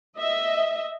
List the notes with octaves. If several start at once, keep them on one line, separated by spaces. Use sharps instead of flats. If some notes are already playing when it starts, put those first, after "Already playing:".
D#5 E5